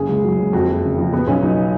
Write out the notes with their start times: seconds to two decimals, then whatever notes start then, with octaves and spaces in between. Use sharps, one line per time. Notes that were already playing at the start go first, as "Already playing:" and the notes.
Already playing: F#1 C#3 G#4
0.09 C#2
0.24 F#3
0.38 C#2
0.53 F2 F#4
0.67 F#1
0.83 C#3
0.97 F3
1.12 B2 B3
1.27 B1 C#4
1.42 F#3 D#4